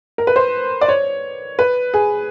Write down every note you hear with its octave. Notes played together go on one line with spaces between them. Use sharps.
A#4
B4
C5
D5
C#5
B4
G#4